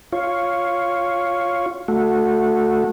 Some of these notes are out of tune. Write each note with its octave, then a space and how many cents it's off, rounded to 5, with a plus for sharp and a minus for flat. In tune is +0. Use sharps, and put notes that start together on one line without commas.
F4 +0 C#5 +0
A3 +0 F#4 -20